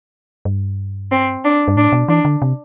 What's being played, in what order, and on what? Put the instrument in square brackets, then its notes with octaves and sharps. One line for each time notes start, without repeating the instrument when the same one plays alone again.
[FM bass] G2
[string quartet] C4
D4
[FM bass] G2
[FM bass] A2 [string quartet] D4
[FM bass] B2
[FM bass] E3 [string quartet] D4
[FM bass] D3
C3